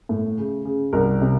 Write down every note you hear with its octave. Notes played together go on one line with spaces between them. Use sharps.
A2
C#3
C#3
C2 A#4
C3